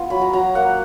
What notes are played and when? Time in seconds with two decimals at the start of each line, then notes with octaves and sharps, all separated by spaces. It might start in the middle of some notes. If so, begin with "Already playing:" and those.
Already playing: B3 F4
0.10 F#3 B5
0.22 A#5
0.33 F#3 A#5
0.55 A#3 F#5